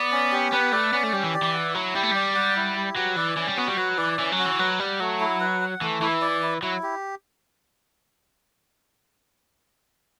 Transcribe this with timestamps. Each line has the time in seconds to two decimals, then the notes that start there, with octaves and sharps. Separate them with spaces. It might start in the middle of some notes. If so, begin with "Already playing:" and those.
Already playing: B3 D5
0.12 C#4
0.32 G4
0.53 B3 B4
0.73 A3 D5
0.93 B3 C#4
1.04 A3
1.13 G3 G4
1.23 E3
1.34 D5
1.43 E3
1.54 F#5
1.74 F#3 E4
1.95 G3 G4
2.03 A3
2.11 G3 D5
2.35 F#5
2.56 E4
2.76 G4
2.96 F#3 B4
3.16 E3 D5
3.37 E3 C#4
3.48 G3
3.57 B3 F#4
3.68 G3
3.78 F#3 B4
3.98 E3 D5
4.19 E3 C#4
4.32 F#3
4.38 F#4
4.46 E3
4.59 F#3 B4
4.80 G3 F#5
5.00 F#3 A3
5.20 E4
5.40 B4
5.61 F#5
5.81 E3 A3
6.02 E3 E4
6.22 D5
6.43 E4
6.63 F#3 E4
6.83 G4